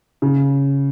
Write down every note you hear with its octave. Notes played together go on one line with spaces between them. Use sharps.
C#3